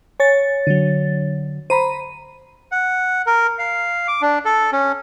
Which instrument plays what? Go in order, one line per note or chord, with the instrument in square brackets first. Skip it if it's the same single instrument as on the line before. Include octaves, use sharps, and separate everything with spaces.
[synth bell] C#5 A6 [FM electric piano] G#5
[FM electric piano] D3 F#3
[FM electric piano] C5 A#5 B5 [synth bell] D#7
[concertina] F#5
A#4
F5
D6
D4
A4
C#4